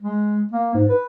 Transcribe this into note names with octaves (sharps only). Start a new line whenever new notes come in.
G#3
A#3
G#2
B4